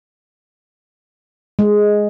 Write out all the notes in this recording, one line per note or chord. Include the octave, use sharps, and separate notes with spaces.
G#3